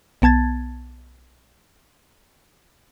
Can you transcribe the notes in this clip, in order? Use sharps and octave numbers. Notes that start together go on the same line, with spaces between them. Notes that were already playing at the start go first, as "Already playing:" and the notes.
B1 B3 A5 G#6 A6